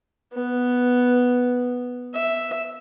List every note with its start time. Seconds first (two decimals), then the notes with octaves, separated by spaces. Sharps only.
0.33 B3
2.14 E5